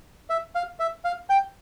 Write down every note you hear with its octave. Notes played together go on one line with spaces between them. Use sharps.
E5
F5
E5
F5
G5